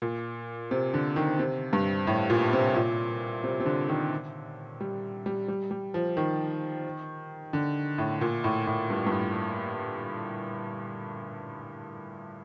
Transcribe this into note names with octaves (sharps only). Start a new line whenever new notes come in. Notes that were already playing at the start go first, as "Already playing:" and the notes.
A#2
C3
D3
D#3
C3
G2
A2
A#2
C3
A#2
C3
C3
D3
D#3
G3
G3
G3
G3
F3
D#3
D3
A2
A#2
A2
A2
G2
G2
A2